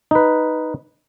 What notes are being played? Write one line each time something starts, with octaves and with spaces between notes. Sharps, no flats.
D#4 B4